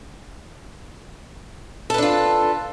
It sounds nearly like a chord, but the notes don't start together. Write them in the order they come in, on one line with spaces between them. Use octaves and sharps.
A4 B4 D4 F4